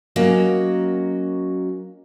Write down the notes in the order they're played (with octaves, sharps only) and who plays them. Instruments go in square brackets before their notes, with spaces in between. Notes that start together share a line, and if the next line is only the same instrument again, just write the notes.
[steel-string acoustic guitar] F#3 A#3 C#4 F#4 D#5